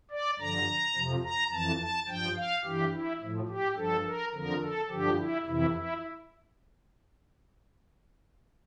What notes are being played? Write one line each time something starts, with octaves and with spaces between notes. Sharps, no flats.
D5
G2 D3 F3 A#5
F2 C3 F3
A#5
F2 E3 A5
A5
G2 F3 G5
F5
G2 E3 G4
E4
A2 F3
G4
G2 F3 A4
A#4
F2 D3 F3 A#4
A4
G2 D3 F3 G4
E4
F2 C3 E3 E4
E4